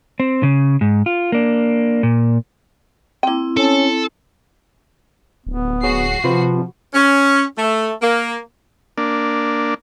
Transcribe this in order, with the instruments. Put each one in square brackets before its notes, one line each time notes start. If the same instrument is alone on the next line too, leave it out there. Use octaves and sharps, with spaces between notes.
[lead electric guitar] C4
C#3
G#2
F4
A#3 D4
A#2
[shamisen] A#3 G5 [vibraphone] C4 E4
[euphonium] C#4 [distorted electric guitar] A4
[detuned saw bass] D1 [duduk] B3
[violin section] F#4 C7 [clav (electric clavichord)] G#4 C#5
[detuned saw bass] C3 [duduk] F3 [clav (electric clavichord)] F4 B4 C5
[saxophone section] C#4
A3
A#3
[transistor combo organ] A#3 D4